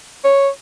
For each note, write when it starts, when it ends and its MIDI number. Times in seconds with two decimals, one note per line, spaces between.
0.25 0.49 73